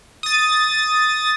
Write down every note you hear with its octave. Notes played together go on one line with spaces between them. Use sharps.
D#6 A6